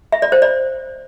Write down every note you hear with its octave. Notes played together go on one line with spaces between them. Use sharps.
E5
D5
C5
D5